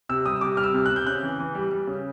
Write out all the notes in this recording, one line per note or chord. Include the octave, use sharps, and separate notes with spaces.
C3 E6
G3 D#6
C3 D6
G3 F6
E6
C3
C3 F#6
G6
C#3 F#6
E3
E3
G3
G3
C#3